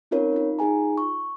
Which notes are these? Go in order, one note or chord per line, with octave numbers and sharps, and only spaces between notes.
C4 C#4 D#4 F4 A#4 C#5
D#4 F4
D#4 F4 G#4 G#5 A#5
C#6